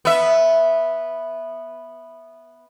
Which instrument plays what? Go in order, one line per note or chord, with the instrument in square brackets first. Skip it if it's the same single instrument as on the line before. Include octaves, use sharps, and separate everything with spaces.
[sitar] B3 E5